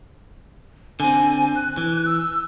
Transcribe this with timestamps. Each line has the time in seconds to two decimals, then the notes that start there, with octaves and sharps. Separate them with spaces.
1.00 D3 C4 G#5
1.55 F#6
1.77 E3
2.05 E6